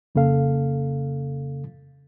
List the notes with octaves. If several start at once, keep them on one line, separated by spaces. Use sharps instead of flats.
F2 C#3 A#3 A4 F5